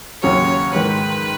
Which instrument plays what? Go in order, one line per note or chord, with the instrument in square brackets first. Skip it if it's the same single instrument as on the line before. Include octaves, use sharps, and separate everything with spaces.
[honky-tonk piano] D#2 C#3 F#3 C#4 F#4 [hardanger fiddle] C#5
[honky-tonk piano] G#2 D#3 G#3 [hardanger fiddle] B4